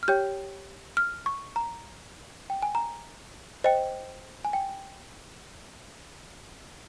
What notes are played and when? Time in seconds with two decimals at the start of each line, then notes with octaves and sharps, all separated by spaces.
0.03 F6
0.08 G4 C#5 G5 G6
0.97 F6
1.26 C#6
1.56 A#5
2.50 G5
2.62 G#5
2.75 A#5
3.64 C5 D#5 G5
4.45 G#5
4.53 G5